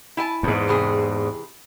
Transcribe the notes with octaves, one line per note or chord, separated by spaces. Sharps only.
E4 G#5 A5
E2 G#2
C3 E3 G#4